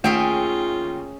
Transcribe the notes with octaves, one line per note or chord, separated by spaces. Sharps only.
D#2 A3 C#4 F4 G#4 E5 G5 D7